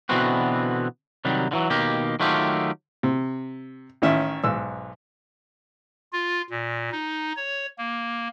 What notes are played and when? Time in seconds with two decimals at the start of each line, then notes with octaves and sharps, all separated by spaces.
0.09 B2 D3 E3 B3 C4 F#4
1.25 C3 D#3 F#3 G3
1.51 D3 E3 F#3
1.70 B2 D#3 A#3 G4
2.20 D#3 F#3 A3 F4 G4
3.03 C3
4.02 A1 D#3 C#4 E5
4.44 B1 G#2 E6
6.12 F4
6.50 A#2
6.92 D#4
7.36 C#5
7.78 A#3